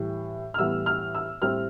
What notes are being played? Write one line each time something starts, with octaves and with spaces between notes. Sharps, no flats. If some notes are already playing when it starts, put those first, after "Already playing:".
Already playing: A2 E3 G3
F6
A2 E3 G3 B3 E6
F6
E6
A2 G3 C4 F6